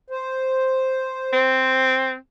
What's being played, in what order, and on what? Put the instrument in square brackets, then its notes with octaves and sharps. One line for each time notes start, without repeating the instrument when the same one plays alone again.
[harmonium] C5
[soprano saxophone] C4